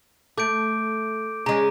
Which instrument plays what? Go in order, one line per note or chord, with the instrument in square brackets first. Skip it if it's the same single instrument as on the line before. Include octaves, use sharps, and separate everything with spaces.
[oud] A3 [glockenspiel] D6 G6 D7
[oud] C#3 G#3 [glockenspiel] A#5